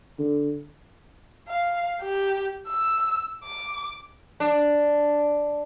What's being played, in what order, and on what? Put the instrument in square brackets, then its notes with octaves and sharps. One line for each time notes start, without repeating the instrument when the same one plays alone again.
[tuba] D3
[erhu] F5
G4
E6
D6
[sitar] D4